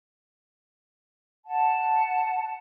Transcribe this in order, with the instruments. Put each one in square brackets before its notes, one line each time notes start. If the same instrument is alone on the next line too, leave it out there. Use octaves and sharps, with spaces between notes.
[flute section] F#5 A5